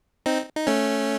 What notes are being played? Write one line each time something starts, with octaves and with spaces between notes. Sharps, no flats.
C4 D#4
D#4
A3 C#4